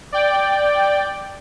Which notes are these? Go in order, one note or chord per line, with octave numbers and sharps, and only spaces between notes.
D5 G5